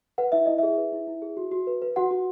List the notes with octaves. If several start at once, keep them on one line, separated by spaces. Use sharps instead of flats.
B4 F#5
E4 E5
E4 D#5
G#4 E5
B4
E4
E4
G#4
F#4
F#4
B4
B4
F#4 F#5
F#4